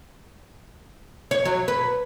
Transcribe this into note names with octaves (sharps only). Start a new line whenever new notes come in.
C#5
F#3
B4